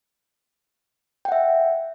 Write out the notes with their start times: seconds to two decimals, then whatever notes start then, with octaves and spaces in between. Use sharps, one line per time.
1.25 G5
1.29 F#5
1.32 E5